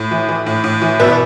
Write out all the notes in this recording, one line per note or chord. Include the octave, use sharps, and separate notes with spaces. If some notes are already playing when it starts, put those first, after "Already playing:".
Already playing: A2
E3
E3
A2
A2
E3
B2 B4 E5